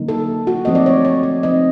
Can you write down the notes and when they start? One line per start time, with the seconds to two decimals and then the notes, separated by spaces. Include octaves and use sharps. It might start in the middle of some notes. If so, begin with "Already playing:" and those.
Already playing: D3 F#3 A#3 D#4
0.09 A4
0.47 F#4
0.65 F3 A3 C4 D#4 D#5
0.75 D5
0.86 C#5
1.05 C#5
1.23 D5
1.43 F3 A3 C4 D#4 D#5